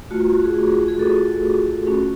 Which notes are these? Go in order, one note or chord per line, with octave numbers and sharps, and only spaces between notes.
A3 F4 F#4
F#4
F#4
G#4
G#4
G#4
G#4
F#4 A4
A3 C#4 F#4